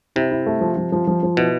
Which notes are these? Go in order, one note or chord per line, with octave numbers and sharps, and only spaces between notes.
C3 E4
E4
A3
F3
F3
F3
F3
F3
B2 E4